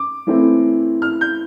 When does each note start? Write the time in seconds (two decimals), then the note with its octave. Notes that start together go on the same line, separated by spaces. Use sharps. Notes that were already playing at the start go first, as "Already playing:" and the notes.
Already playing: D6
0.27 E3 A3 C4 E4
1.02 F6
1.21 G6